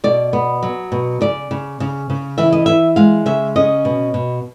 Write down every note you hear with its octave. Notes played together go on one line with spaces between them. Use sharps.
B2 D5
B3
F#3
B2
C#3 D5
C#3
C#3
C#3
E3 E5
D#5
E3 E5
G#3 F5
C#3 E5
C#4 D#5
B2
B2